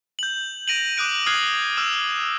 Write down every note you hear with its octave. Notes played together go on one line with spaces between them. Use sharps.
G6 F#7
A#6 D7 D#7 F7 F#7
D6 D#6 F#6 D7
D#6 F6 F#6 G#6 C7 D7
D6 E6 F6 E7